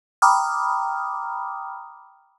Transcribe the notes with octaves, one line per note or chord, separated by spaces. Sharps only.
G5 A#5 B5 D6 D#6 F6